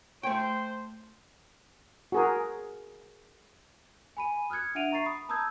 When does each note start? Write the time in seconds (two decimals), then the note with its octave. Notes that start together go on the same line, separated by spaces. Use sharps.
0.23 A3 C5 G5
2.12 F#4 G#4 A#4
4.17 G#5 B5 D#7
4.50 D#6 F6 F#6 G#6 C#7
4.75 D4 E5 F#5 D7 D#7 F7
4.91 E5 A#5 C#6 A6 C7
5.05 B5 D#6
5.29 A5 A#5 D#6 E6 G6 G#6